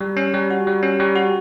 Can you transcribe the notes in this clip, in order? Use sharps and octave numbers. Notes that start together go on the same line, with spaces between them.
G3
C#4
G3
F#4
G3
C#4
G3
F#4